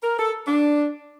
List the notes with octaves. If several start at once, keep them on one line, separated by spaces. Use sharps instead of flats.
A#4
A4
D4